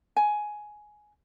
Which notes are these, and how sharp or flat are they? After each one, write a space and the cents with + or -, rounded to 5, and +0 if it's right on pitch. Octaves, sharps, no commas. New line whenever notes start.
G#5 +10